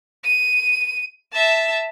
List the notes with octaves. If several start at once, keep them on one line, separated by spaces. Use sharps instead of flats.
D#7
E5 A5